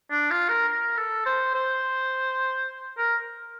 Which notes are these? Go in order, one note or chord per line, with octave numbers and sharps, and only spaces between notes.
D4
F4
A#4
A#4
A4
C5
C5
A#4